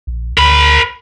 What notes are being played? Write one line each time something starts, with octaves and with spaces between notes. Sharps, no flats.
A#1
D2 A#4 B5